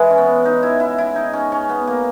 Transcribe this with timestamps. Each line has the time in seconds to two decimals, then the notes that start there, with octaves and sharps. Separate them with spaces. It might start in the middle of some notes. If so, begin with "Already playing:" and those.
Already playing: E3 G#3
0.10 C#4
0.18 B3
0.45 D#4
0.63 E4
0.80 E4
0.98 E4
1.16 D#4
1.33 C#4
1.52 C#4
1.69 B3
1.87 A#3